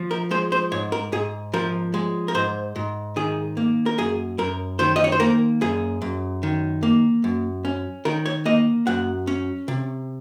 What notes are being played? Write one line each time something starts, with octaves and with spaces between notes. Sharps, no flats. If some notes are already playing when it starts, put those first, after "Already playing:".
Already playing: F3
A#4
G#3 C5
C5
G#2 C#5
A#4
G#2 G#4
F3 A#4
G#3
A#4
G#2 C5
G#2
D#3 G#4
A#3
A#4
F#2 G#4
F#2 A#4
D#3 C5
D#5
C#5
C5
A#3 A#4
F#2 G#4
F#2
D#3
A#3
F#2
C#4
D#3 A#4
C#5
A#3 D#5
F#2 F#5
C#4
C3